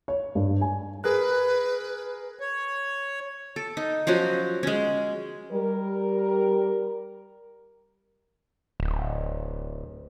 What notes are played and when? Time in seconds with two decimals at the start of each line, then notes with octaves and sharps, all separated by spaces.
0.08 C#5
0.35 G2
0.61 G#5
1.04 G#4 A#4 B4 F#6
2.39 C#5
3.56 A4
3.77 D#4
4.07 F3 F#3 C#4 F#4
4.63 G#3 C#4
5.52 G3 A#4
8.80 D1